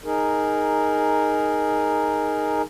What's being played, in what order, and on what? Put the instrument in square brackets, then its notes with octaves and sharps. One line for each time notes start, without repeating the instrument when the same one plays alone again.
[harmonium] D#4 G#4 A#4